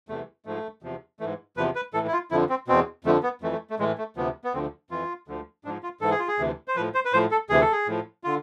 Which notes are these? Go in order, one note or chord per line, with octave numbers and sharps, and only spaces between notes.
E2 C3 E3 A3
G#2 F3 A3
E2 C3 F3
G#2 E3 A3
E2 C3 F3 B4
B4
A2 E3 A4
E4
F4
F2 D3 F3 E4
C4
E2 B2 C4
F2 D3 F3 A3
B3
F2 E3 A3
A3
A3
A2 E3 G#3
A3
D2 C3 F3 B3
B3
D2 D3 F3 C4
F2 E3 F4
D2 D3 F3
G#2 F3 D4
F4
G#2 E3 A4
G#4
F4
G#4
D2 C3 E3
C5
A2 F3 B4
C5
B4
A2 F3 C5
A4
D2 C3 E3 G#4
A4
G#4
A2 F3
D3 F4